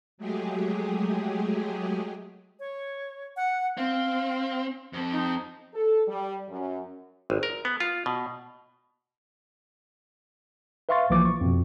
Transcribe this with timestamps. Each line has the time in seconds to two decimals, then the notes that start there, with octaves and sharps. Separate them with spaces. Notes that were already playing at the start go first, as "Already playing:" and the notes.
0.18 F#3 G#3 A3 G4 G#4
2.59 C#5
3.36 F#5
3.77 C4 F5
4.93 F2 C4
5.12 D#4
5.73 A4
6.07 G3
6.48 F#2
7.30 G#1
7.43 A#4
7.65 B3
7.80 F4
8.06 B2
10.89 B4 E5 F5 C6 C#6 A6
11.10 B1 E3 F3 A#3 D6 A6
11.25 C#6
11.41 F2 B2